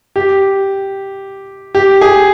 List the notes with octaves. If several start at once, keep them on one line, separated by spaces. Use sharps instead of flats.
G4
G4
G#4